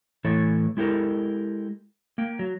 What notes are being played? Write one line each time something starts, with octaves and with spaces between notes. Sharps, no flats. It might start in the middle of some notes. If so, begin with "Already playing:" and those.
A2 E3 E4 A4 C#5
G#3 E4 G4 A4 A#4
A#3 G5
F#3